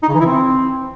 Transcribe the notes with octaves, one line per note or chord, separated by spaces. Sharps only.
D#4
C#3
E3
E4
C4